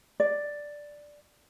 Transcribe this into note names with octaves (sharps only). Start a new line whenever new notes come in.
D5